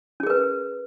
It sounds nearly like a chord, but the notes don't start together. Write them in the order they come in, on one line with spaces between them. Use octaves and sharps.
C#4 G#4 A#4 B4